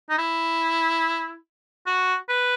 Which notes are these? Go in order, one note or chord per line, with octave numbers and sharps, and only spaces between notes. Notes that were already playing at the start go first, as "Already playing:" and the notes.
D#4
E4
F#4
B4